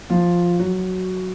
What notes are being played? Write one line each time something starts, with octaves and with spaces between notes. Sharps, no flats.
F3 F4
F#3 F#4